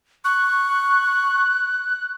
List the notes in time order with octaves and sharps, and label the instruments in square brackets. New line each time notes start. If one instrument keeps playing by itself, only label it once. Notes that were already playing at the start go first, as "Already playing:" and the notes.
[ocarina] C#6 [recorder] F#6